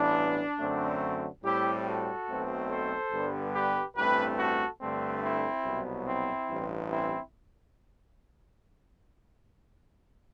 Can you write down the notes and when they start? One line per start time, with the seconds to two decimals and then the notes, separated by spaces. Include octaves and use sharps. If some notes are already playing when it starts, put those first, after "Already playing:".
Already playing: A1 G2 E3 B3 D4
0.60 F#2 D3 F#3 A3 C4
1.44 A2 G3 C4 E4 G4
1.86 F#4 A4
2.28 B1 B2 A3 C4
2.70 A4 C5
3.12 G2 D3 G3 B3
3.54 G4 B4
3.96 A1 G2 E3 A3 C4 G4 B4
4.38 F#4 A4
4.80 G2 D3 A3 C4
5.22 C4 E4
5.64 C2 B2 F#3 B3
6.06 C4 E4
6.48 A1 G2 E3
6.90 C4 E4